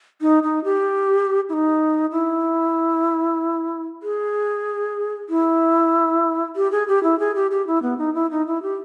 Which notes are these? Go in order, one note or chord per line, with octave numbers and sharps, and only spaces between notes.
D#4
D#4
G4
E4
D#4
E4
G#4
E4
G4
G#4
G4
E4
G#4
G4
G4
E4
B3
D#4
E4
D#4
E4
G4